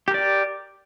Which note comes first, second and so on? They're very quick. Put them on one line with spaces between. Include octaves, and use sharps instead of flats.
G4 A#4 D5